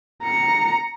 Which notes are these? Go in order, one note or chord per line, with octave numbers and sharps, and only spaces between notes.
A#5 C#7